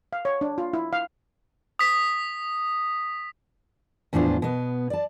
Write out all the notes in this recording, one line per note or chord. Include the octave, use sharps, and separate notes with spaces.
F5
C#5
D4
F4
E4
F5
D#6 B6
E2 A2 F3 D4 F4 C5
B2 B3
D5 A5